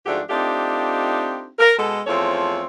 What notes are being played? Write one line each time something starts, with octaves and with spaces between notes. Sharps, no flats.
G#2 F3 A3 D4 F#4 G4
A3 C4 D4 D#4 F4 G4
A#4
B2 G#3 B3 A4
E2 F3 A3 C4 A4 C#5